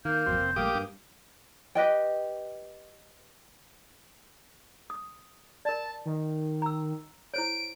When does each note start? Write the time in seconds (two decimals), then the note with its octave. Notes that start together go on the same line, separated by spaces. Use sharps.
0.05 D#3 A#3 G6
0.26 G#1 F2 F#3 C4
0.40 F1
0.56 A#1 G3 A3 A#3 G4 D6 D#6
0.74 G2
1.75 G4 B4 D#5 G5
4.90 D#6
5.65 A#4 D5 A5
6.06 D#3
6.62 A#5 E6
7.34 E4 C5 C#5 D7